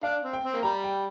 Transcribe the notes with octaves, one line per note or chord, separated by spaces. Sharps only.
D4 F5
C4
G5
C4
A#3
G3 A#5
G5